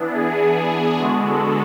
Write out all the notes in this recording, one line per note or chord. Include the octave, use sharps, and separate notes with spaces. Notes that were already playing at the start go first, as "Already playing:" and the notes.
Already playing: E3 B3 D4
G#4
E3 B3 D4
D3 G#3 B3 D4 F#4
A4